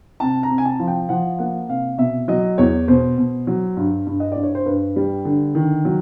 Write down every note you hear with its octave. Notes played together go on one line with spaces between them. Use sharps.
C3 A5
A#5
C3
G#5
A5
F3
G5
F3 F#5
A#3 F#5
C3 F5
B2 E5
F#3 D#5
E2 C#5
B2 C5
B2
F#3
G2
G2
D#5
G2 D5
C#5
C5
G2 B4
G3
D3
D#3
F#3